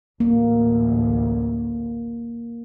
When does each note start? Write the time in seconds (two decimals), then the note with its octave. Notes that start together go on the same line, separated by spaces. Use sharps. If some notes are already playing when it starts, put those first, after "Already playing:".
0.20 A1 D2 A#3